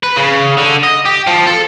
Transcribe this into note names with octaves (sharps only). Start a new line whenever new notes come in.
B4
C#3
D3
D#5
G4
F3
A4